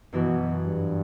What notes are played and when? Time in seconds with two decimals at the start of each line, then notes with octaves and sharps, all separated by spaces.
0.13 F#2 B2 E3 B3 F#4
0.66 G2